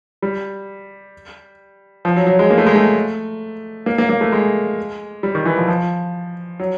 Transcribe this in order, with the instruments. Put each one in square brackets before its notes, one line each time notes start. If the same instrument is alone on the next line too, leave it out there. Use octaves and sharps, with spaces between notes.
[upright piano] G3
F3
F#3
F#3
G#3
A#3
A3
G#3
A3
A#3
A#3
A#3
A3
G#3
G3
D#3
E3
F3
F3
F#3